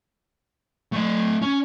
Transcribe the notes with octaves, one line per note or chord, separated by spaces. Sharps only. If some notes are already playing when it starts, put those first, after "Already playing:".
A3 D#5
C#4